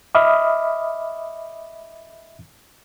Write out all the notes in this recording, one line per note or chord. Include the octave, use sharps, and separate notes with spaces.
D#5 E5 B5 D6 D#6 F6